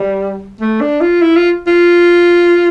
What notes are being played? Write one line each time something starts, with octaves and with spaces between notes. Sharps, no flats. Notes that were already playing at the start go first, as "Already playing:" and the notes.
Already playing: G3
A3
D4
F4
E4
F4
F4